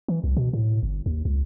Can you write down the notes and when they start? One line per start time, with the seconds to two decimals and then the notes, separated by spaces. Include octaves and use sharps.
0.08 E3
0.24 C2
0.37 B2
0.53 A2
0.83 G1
1.06 D#2
1.25 C#2